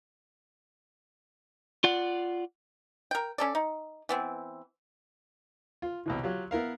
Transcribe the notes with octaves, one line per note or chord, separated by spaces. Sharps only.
F4 D5 F#5
A#4 G5
C#4 A4 D5
D#4
E3 B3 C4
F4
C2 B2 E3
F#3 F4 G4
B3 E4 A#4 F5